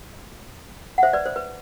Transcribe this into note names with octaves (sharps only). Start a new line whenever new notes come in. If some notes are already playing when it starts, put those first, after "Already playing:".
F#5
C5 E5
B4 D5
C5
B4